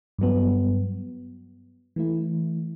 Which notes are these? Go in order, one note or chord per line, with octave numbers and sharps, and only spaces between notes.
G2 F#3 B3
E3 A3 E4